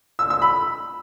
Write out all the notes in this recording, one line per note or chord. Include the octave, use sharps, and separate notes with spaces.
E6
E6
B5